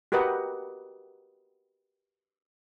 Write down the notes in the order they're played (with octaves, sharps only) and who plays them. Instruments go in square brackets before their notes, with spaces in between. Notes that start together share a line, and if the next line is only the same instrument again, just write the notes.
[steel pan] F#4 G4 A#4 B4 D#5 F#5